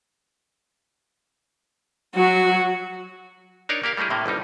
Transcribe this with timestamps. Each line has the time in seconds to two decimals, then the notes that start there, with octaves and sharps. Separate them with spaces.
2.15 F#3 F#4
3.69 D4 D#4 A#4 C#5 D5
3.84 A#3 G4 A#4 F5
3.97 G3 A3 A#3 E4 G#4
4.10 A2 C3 A3 A#3
4.26 G1 C2 G3 D#4